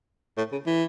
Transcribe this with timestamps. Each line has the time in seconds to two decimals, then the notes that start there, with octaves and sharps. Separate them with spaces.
0.38 A2
0.52 C#3
0.67 E3